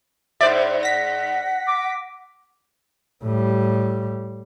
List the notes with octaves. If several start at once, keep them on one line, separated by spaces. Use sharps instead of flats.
G#2 C5 D5 E5
F#5 A#6 B6
D6
A2 G3